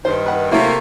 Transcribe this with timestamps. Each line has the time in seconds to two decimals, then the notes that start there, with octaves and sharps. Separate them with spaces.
0.05 G2 D#3 C5
0.26 B4 F#5
0.51 A2 C3 F#3 A3 A#3 E4